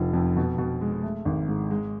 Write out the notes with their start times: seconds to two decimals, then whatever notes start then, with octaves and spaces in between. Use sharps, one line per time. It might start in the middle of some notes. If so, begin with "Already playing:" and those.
Already playing: F1 F3
0.14 F2
0.37 B2
0.58 B2
0.81 G#3
1.03 A3
1.25 G#1
1.48 G#2
1.71 G#3